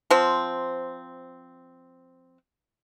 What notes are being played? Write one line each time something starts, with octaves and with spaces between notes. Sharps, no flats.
F3 C4